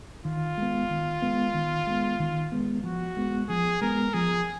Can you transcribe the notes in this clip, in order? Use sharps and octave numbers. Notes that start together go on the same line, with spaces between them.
D#3 F4
G#3 B3
D#3
G#3 B3
D#3
G#3 B3
D#3
G#3 B3
F3 F#4
G#3 B3
F3 G#4
G#3 B3 A#4
F3 G#4